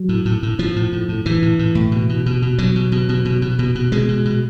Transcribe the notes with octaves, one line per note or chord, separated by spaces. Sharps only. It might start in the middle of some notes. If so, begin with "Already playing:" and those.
Already playing: F#3
A2
A2
A2
A2 F3
A2
A2
A2
A2 E3
A2
A2
A2
B2
B2
B2
B2
B2 F#3
B2
B2
B2
B2
B2
B2
B2
B2 G#3
B2
B2